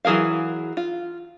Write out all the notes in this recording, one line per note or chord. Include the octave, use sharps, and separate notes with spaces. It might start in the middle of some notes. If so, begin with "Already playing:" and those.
E3 F#3 G#4 A#4 F5
F4